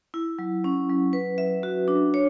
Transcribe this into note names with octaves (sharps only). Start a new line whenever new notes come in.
E4
F#3
C#4
F#3
B4
E5
F#4
D4
C#5